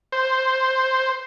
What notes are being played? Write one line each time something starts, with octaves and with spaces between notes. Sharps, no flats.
C5